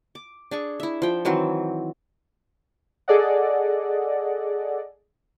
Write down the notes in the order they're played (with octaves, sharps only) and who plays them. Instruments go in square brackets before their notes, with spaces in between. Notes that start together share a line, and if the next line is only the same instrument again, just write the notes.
[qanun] D6
D4 G#4 C#6
E4 E5
F3 G5
D#3 E3 F#3 C4
[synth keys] G#4 A4 D5 D#5 F#5